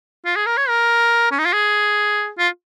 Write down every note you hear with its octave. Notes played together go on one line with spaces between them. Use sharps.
F4
G#4
A#4
C#5
A#4
C#4
D#4
F4
G#4
F4